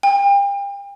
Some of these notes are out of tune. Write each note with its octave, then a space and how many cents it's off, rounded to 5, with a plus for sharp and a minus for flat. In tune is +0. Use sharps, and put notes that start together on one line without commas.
G5 +35